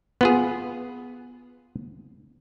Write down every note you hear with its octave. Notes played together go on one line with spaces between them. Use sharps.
B3 F4 G#4